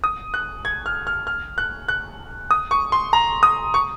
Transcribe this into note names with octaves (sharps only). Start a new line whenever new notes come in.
D#6
F#6
G#6
F6
F6
F6
F#6
F#6
D#6
C#6
C6
A#5
D#6
C#6